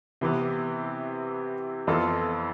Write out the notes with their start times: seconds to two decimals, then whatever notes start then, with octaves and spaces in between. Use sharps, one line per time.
0.21 C3 E3 B3
1.87 F2 E3 B3 F4 A4